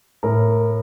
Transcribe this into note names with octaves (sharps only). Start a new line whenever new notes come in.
A2 A#4